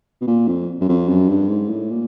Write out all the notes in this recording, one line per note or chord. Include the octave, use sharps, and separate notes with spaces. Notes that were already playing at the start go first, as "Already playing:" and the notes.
B2
A#2
F2
F#2
F2
F#2
G2
G#2
A2
A#2